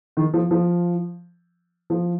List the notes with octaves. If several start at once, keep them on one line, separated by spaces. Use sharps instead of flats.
D#3
F3
F3
F3